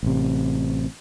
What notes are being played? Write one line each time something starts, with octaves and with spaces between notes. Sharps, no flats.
A1 C3